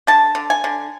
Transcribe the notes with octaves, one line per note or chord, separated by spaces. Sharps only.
D3 A5
D3
G#5
D3